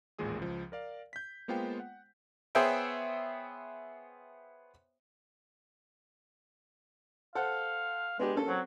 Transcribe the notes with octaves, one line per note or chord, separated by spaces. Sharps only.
A1 D#2 A#2 G#3 G#4 D#6
C#2 F3
A#4 D5 F5
G6 B6
G#3 A#3 B3 F4 C5 G5
F#5
B3 G#4 C5 C#5 E5 G5
A4 C5 F5 F#5
G#3 B3 D4 G4
A#3 C#4 A4
F#3 C4